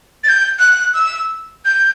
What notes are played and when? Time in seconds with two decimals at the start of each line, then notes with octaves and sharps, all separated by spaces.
0.24 A6
0.29 G6
0.59 F#6
0.94 E6
1.65 G6